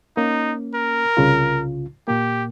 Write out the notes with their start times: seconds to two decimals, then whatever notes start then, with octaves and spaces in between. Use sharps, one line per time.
0.17 A#3 C#4 D#4
0.75 A#4
1.17 C2 C#3 F4
2.08 A#2 A#3 G4